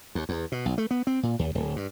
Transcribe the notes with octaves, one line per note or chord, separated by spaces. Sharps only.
D#2
E2
B2
B1
A3
B3
C4
A#2
D#2
D1
G2